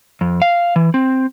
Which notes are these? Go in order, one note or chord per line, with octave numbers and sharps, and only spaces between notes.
F2
F5
E3
C4